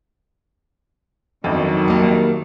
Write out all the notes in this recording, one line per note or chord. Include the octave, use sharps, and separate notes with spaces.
G1 F2 D#3 F#3
G3 A#3